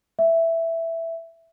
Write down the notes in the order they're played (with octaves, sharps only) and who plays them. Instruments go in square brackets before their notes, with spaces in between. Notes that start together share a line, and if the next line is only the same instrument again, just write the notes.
[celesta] E5